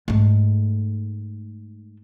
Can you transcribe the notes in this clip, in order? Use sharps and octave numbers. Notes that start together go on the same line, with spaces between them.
G#2 A3